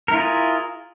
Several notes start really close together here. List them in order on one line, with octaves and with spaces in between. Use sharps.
A#4 E4 F4 G#4